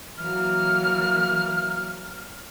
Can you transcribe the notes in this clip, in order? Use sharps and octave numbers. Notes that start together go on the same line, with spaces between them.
E3 F#3 A#3 F6